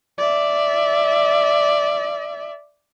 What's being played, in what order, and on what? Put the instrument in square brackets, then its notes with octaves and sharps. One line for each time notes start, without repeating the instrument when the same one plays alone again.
[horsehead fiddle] D5 E5